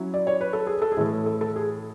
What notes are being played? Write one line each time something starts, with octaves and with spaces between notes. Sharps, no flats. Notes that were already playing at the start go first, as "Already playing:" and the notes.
Already playing: F#3 C#4 E4
D5
C#5
B4
A4
G#4
A4
G#4
A2 E3 A3 A4
A4
A4
G#4